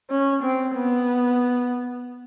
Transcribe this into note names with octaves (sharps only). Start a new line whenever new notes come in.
C#4
C4
B3